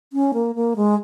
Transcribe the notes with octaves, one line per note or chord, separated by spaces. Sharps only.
C#4
A#3
A#3
G#3